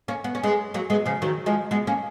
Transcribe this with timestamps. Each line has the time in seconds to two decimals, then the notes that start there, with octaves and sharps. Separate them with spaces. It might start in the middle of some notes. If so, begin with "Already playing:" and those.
0.08 A#3 C#4
0.24 B3
0.35 C#4
0.43 G#3 B3
0.74 F#3 A#3
0.90 G#3 B3
1.06 C#3 F3
1.22 D#3 F#3
1.46 F3 G#3
1.71 G#3 B3
1.87 A#3 C#4